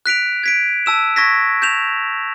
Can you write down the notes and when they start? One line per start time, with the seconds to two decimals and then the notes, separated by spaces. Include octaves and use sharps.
0.06 F#6 B6 D7 F7
0.43 G#6 B6 D7
0.86 A5 E6 E7
1.16 C#6 G#6 A#6 B6
1.62 G6 E7 F7